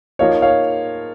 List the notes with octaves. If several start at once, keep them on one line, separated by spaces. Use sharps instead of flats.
F3 A#3 D#4 C#5 F5
C#5 F5